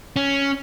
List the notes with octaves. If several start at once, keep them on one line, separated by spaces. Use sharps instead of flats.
C#4